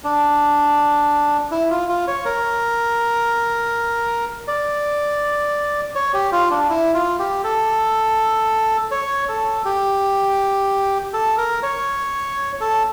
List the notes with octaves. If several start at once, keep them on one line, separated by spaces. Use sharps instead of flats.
D4
E4
F4
F4
C#5
A#4
D5
C#5
G4
F4
D4
E4
F4
G4
A4
C#5
A4
G4
A4
A#4
C#5
A4